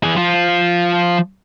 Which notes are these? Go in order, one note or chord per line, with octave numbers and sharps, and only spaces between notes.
E3 G#4
F3 F4